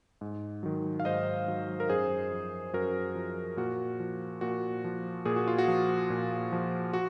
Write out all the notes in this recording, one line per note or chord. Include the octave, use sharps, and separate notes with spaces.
G#2
D#3 F#3
F5
G#2 C5 D#5
D#3 F#3
A#4
F#2 G#4 C5
F3
F#2 F#4 A#4
F3
A#2 F#4
F3
A#2 F#4
F3
A#2 G#4
F#4
F4
F#4
F3
A#2
F3
F#4